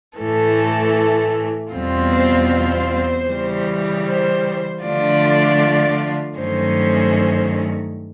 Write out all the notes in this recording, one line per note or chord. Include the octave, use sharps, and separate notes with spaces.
A2 E3 A3 A4
E2 B2 G3 C4 F4
C5
C5
C#3 E3 G3
C5
D3 F3 A3 D4 F4 D5
G2 D#3 F#3 A3 C#4 C5